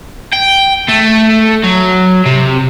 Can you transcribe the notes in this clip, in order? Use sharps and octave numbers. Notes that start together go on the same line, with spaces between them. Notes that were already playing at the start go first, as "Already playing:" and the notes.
G5
A3
F#3
C3